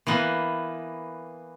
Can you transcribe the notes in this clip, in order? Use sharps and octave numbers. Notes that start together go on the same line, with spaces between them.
E3 A#3 B3